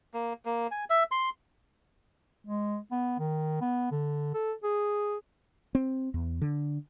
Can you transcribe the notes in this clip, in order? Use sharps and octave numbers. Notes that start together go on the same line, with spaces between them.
A#3
A#3
G#5
E5
C6
G#3
B3
D#3
B3
D3
A4
G#4
C4
E2
D3